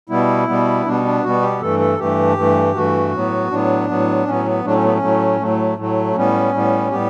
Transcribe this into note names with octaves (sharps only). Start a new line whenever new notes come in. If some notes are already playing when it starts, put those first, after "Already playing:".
B2 G3 B3 E4
B2 G3 B3
B2 G3 B3 D4
D4
B2 G3 B3 F#4
G4
G2 E3 A3 A4
A4
G2 E3 A3 G4
G2 E3 A3
G2 E3 A3 F#4
A2 F#3 B3
A2 F#3 B3 D4
A2 F#3 B3
A2 F#3 B3 C#4
B3
A2 F#3 A3 D4
C#4
B3
C#4
A2 F#3 A3
A2 F#3 A3
A2 F#3 A3
A2 G3 B3 C#4
A2 G3 B3
A2 G3 B3 G4